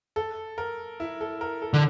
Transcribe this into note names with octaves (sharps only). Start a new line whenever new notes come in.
A4
A#4
E4
A4
A#4
A4
D3